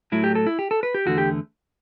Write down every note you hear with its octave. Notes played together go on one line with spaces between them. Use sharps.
A2 F#3 A3 E4
G4
A4
E4
G4
A4
B4
G4
E2 D3 A3 F#4
G4